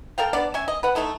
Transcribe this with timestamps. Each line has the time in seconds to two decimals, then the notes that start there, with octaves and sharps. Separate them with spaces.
0.18 A4 A#4 F5 G5
0.33 B3 D4 D5
0.54 C#4 E5 G#5
0.68 D#5
0.83 B4 F#5
0.95 A3 D#4 E4 A4